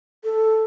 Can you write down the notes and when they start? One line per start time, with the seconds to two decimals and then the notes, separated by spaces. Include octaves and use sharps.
0.24 A4